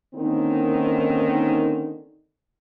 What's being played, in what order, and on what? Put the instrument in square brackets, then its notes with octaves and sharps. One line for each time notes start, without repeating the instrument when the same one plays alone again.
[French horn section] D3 D#3 A#3 C4 C#4 D#4